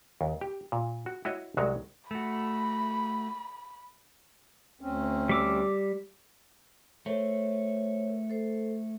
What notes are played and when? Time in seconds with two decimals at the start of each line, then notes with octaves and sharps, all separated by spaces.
0.21 D#2
0.41 G4
0.72 A#2
1.06 F#4
1.25 E4 F#4 C#5 D#5
1.57 C2 F#3 G#3 F#4 A#5
2.11 A3 F#4 B5
4.81 D2 C4 C#4
5.29 G3 D6 E6
7.06 A3 A#4 C5 C#5
8.30 A4 C5